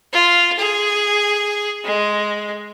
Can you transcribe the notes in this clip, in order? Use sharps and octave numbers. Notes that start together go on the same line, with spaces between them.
F4
G#4
G#3